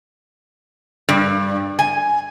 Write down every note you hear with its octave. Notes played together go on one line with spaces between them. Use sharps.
G2
G#5